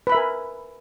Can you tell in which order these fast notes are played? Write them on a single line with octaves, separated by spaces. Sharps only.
B4 B5 E5 A#4 G#5